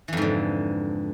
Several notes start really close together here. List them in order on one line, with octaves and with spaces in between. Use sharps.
E3 F2 G#2 D3